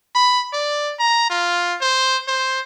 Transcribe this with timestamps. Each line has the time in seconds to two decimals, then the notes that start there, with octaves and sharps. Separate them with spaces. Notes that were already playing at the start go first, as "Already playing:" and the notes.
0.15 B5
0.53 D5
0.99 A#5
1.30 F4
1.81 C5
2.28 C5